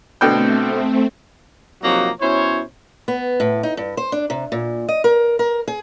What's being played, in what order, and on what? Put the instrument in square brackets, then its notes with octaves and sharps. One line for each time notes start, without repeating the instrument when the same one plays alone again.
[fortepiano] B2 D3 G5 [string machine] A3 C4
[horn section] C3 F3 F#3 A#3 D#4 F#4
B2 C#4 E4 C5 C#5
[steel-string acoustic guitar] B3
A2
D#4
G2
C5
D4
C3
A#2
D#5
A#4
A#4
G#4